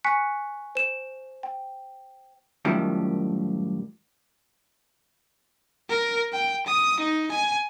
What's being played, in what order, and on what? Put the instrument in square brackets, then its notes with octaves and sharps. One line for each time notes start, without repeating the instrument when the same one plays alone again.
[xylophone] G#5 C#6 F#6 B6 C#7
C5 E7
G5
[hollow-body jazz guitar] F#2 A2 D#3 F3 G3
[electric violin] A#4
G5
D#6
D#4
G#5